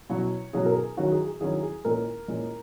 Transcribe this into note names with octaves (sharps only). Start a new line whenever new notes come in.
B2 F#3 C#4 E4 C#5
B2 F#3 C#4 E4 G#4
A#4
G#4
D#3 F#3 C#4 E4 F#4
G#4
G#4
D#3 F#3 C#4 E4 G#4
G#4
A#2 G#3 C#4 E4 A#4
A#2 G#3 C#4 E4